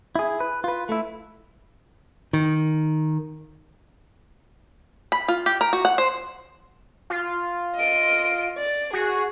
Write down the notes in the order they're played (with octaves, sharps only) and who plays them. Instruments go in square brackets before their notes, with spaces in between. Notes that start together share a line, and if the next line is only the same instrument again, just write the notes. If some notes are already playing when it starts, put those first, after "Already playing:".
[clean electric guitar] E4 G#4
B4
F4 B4
A3 E4
[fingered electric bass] D#3
[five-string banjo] B5
F4
G4
A#4
F#4
F#5
C5
[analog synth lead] F4
[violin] D#5 D7
D5
[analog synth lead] F#4 [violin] G#4